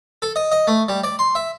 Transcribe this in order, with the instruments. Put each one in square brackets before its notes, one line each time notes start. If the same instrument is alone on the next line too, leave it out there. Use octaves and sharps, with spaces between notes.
[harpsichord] A4
D#5
D#5
A3
G3
D5
C6
E5